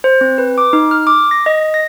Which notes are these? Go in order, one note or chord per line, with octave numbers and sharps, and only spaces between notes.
C5
C4
B4
D6
D#4
F6
D6
A#6
D#5
A#6